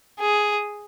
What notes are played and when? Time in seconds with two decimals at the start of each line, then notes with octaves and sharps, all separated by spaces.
0.20 G#4